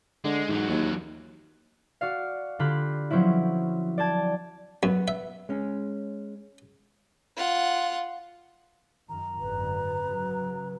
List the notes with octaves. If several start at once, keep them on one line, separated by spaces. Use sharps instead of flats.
D3 G#3
E2 G#2 F#3
D#2
F#4 D5 F5
D3 F4 G4 B5 F#6
F3 F#3 C4 C#4 E4
D5 G5 A5 G#6
F#2 B3
E5
G#3 C#4
F4 F#5
F#2 D#3 A#5
G#1 F#2 D3 B4
C#3 F#3